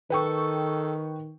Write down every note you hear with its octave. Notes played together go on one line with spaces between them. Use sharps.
D#3 A4 B4 G5 C#6